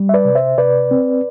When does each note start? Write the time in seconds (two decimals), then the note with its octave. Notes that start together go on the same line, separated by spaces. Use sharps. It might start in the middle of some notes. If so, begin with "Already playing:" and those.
Already playing: G3
0.09 E5
0.14 B4 D5
0.25 C3
0.35 C5 E5
0.58 C3 B4 D5
0.91 C4